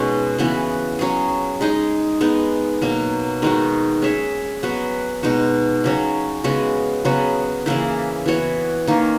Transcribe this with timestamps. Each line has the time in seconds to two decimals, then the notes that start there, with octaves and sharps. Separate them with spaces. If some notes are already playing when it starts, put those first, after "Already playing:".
Already playing: B2 G#3 C#4 D#4 G#4
0.39 C#3 E3 B3 F#4
0.99 F#3 C#4 G#4
1.61 G#3 D#4 G#4 D#5
2.21 G#3 B3 D#4
2.82 B2 F#3 A#3
3.42 D#3 G#3 D#4 F#4
4.02 C#4 G#4 C#5 E5
4.63 F#3 B3 F#4 B4
5.23 B2 G#3 D#4 F#4
5.84 C#3 F#3 C#4
6.44 C#3 G#3 B3 F#4
7.05 C#3 F#3 B3 F#4
7.66 C#3 E3 A#3 E4
8.26 E3 B3 F#4 C#5
8.87 D#3 A#3 C#4